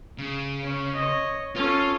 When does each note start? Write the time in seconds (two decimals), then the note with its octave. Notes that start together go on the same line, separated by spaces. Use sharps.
0.18 C#3
0.64 C#4
0.95 C#5 D#5
1.56 C#4 F4 A4